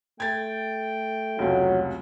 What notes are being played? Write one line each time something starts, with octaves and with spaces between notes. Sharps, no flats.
A3 G5 G#6 A6
F1 C#2 F#3